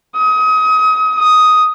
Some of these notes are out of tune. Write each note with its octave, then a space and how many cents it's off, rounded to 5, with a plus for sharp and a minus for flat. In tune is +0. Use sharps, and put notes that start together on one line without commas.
D#6 +30
D#6 +5